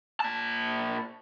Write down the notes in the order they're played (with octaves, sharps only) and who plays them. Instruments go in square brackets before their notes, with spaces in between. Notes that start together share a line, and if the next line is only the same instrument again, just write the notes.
[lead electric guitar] A#2 A5